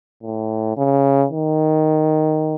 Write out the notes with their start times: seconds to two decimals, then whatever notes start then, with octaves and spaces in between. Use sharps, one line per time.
0.23 A2
0.77 C#3
1.32 D#3